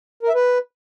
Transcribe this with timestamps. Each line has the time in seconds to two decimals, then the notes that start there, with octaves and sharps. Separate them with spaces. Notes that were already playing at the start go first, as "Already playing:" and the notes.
0.23 A#4
0.29 E5
0.35 B4